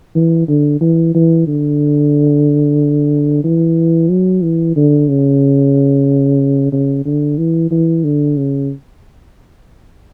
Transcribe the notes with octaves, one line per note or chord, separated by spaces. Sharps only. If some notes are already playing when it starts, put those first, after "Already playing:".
E3
D3
E3
E3
D3
E3
F#3
E3
D3
C#3
C#3
D3
E3
E3
D3
C#3